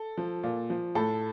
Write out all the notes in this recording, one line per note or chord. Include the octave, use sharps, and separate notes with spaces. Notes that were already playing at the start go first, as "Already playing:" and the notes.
Already playing: A4
F3
A#2
F3
A2 A4